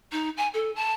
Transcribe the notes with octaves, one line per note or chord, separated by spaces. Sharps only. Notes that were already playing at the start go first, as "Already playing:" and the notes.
D#4
G#5
A4
A5